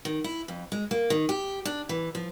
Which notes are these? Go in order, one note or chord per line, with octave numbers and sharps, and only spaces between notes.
D#3
E4
F2
G#3
A#3
D#3
G4
D4
E3
F3